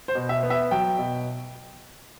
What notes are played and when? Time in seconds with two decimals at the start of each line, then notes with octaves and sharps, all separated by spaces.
0.08 C5
0.15 B2
0.29 E5
0.43 B3
0.50 E5
0.71 F#3 G5
0.99 B2